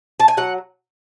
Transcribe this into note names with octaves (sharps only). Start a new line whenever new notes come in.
A5
G#5
F#3 F#5